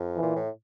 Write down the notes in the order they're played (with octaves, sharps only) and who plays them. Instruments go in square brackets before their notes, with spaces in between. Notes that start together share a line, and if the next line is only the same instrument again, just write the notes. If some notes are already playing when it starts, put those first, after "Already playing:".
Already playing: [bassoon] F2
[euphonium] E3
[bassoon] A#2
A2